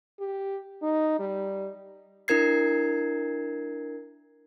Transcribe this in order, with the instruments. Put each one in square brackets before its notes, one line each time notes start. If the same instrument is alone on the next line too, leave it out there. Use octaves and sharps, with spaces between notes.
[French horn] G4
D#4
G3
[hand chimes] D4 E4 A#4 G#6 C7